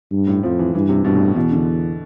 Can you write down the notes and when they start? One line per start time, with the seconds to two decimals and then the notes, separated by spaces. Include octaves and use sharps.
0.12 G2
0.27 A2
0.43 F2 F3
0.59 E3
0.74 G2 E3
0.89 C3
1.05 G2 B2
1.15 A2
1.36 E2 B2
1.51 D3